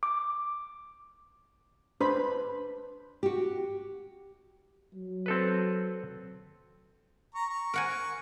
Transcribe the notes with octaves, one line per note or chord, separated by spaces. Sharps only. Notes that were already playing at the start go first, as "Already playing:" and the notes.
D6
D4 B4 C5 B5
F#4 G4
F#3
C4 A4 B4
A#5 C#6
C#6
A#4 F#5 G#5